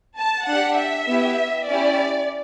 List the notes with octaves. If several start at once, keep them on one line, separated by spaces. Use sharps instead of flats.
A5
D4 G4 F#5
E5
B3 E4 G4
C#4 E4 G4 D5